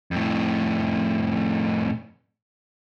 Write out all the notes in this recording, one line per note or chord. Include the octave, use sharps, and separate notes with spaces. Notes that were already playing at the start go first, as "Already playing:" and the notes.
F2 A2